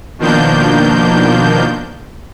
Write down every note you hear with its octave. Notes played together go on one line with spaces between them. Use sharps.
B2 D#3 F3 A#3 D4 G6